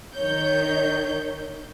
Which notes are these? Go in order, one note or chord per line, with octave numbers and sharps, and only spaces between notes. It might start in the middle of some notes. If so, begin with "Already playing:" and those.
D#3 C#5 G6